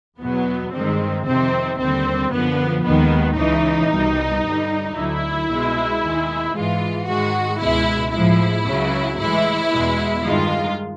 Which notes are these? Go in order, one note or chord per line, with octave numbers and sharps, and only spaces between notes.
E2 B2 F#3 B3
G2 D#3 G#3 C4
F2 C3 D#3 C4
D#2 D3 G3 C4
F#2 D3 F3 B3
D#2 D#3 G#3 B3
C#2 C#3 E3 D#4
C2 B2 G3
G2 D3 G3
D2 D3 F#3 E4
C2 B2 G#3
D#2 D#3 G#3
G#2 E3 G#3 F4
G#2 D#3 G#3 F#4
C#2 B2 G#3 E4
A2 F3 G#3 E4
C#2 C#3 F#3
A2 E3 G#3 E4
E2 B2 G#3
G2 D#3 G#3 F4